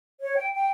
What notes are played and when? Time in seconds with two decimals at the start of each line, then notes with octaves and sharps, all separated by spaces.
0.21 C#5
0.36 G5
0.53 G5